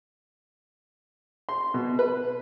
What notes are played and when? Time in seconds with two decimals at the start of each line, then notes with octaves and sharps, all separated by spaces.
1.49 C6
1.74 B2
1.99 B4